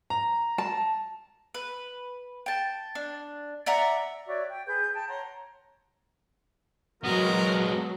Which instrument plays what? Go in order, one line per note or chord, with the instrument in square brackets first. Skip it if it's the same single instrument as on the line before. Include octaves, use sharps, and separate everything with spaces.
[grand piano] A#5
[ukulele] A5
[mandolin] B4
G5 A5
D4
D5 E5 F#5 A#5
[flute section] F#4 C#5 D5 E5
G5
G#4 B4 G6
G5 A5
C#5 F#5 A#5 C6
[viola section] F#3 [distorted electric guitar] G#3 B3 [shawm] A#4